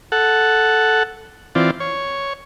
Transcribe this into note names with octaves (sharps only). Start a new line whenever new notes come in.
A4 F#5
E3 C4 F4 D5
C#5